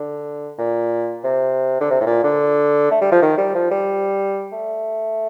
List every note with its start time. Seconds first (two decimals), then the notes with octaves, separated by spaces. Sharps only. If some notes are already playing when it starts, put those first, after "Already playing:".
Already playing: D3
0.59 A#2
1.24 C3
1.81 D3
1.91 C3
2.01 A2
2.06 A#2
2.24 D3
2.91 A3
3.02 G3
3.12 F3
3.22 D#3
3.38 G3
3.55 F3
3.71 G3
4.53 A3